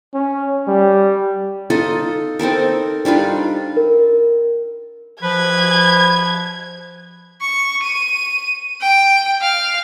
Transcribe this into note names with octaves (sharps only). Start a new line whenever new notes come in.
C#4
G3
D#4 F4 A4 D#5
C4 D#4 A4 A#4
G3 D4 D#4 F4
A#4
F3 B4 G#6
C#6
D#7
G5
F5